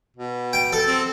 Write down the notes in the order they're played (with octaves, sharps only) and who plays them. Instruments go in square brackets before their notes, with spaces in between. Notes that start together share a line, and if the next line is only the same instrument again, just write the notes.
[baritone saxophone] B2
[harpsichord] G5
A4
[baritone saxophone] C4